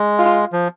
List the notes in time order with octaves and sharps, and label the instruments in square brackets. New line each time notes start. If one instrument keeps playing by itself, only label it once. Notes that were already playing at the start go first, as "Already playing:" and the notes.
Already playing: [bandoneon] G#3
[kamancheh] F4
[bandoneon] F3